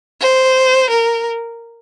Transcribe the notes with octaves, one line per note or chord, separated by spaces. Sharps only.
C5
A#4